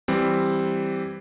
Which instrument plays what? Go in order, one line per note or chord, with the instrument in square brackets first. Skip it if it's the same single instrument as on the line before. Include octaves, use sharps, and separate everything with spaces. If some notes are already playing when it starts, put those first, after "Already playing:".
[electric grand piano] E3 G3 C4